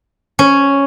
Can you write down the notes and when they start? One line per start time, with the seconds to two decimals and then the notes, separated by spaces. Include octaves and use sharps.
0.39 C#4